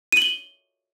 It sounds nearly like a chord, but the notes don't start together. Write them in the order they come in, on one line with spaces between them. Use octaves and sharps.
D#7 F#7 G7